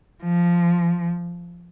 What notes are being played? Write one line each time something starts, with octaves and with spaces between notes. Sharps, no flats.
F3